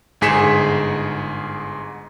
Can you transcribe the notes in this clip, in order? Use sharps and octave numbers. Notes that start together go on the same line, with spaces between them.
G1 G#2 G#4 B6 C#7 E7